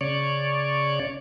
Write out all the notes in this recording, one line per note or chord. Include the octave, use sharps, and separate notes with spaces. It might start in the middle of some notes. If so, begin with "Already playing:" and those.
C#3 C#5 D5